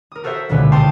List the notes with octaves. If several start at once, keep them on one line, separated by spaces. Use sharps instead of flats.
A#4 D#6
F#4 A4 A#4 C5 E5 F#5
D#1 C#2 B2 D3 G#3 B4
F5 G5 A5 C6 C#6 D#6